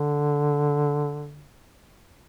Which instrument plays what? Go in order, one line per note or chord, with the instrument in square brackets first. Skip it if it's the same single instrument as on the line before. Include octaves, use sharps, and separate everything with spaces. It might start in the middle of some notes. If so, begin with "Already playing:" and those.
Already playing: [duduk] D3